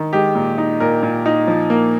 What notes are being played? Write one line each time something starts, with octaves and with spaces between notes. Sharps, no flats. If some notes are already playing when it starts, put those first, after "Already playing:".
Already playing: D#3
G#3 G4
A#2
D#4
A#2 A#4
A#2
D#4
F3
A#3